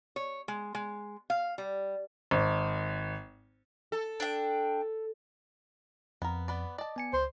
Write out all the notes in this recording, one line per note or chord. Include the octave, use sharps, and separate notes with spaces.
C#5
G#3
G#3
F5
G3
G#1
A4
D4 G5
F2 B3 A#4
B3 B4 D5
D5 D#5 A5
B3 G#5 C#7
C#2 C5